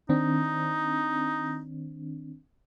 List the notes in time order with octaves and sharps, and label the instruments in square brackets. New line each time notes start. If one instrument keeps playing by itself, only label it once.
[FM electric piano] D#3 C4 D4 [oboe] D#4